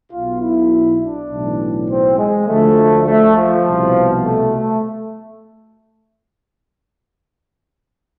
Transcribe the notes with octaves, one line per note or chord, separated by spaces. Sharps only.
B1 B2 F4
E4
D4
B1 A2 E3
C4
G#3
D2 D3 F3 A3
A3
F3
C2 B2
A3
A3